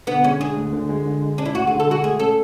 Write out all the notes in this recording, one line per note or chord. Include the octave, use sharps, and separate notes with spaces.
D3 B3
G#3 C#4
D4 G#4
D2
D3
G#3
D3
G#3
C#4 D4
E4
D2 F#4
D3 G#4
A4
G#3 F#4
A3 G#4
C#4 A4